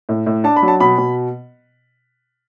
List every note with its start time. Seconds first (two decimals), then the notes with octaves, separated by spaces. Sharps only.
0.09 A2
0.26 A2
0.44 D4 A5
0.56 B5
0.63 F#3
0.68 A5
0.80 B2 B5
0.98 B2